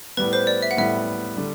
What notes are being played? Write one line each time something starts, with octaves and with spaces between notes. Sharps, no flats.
A2 G3 B3 B4
C5
D5
E5
F#5
A2 G3 B3 E5
D3 G3